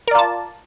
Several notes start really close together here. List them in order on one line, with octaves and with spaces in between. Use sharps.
A#4 D5 F4 A5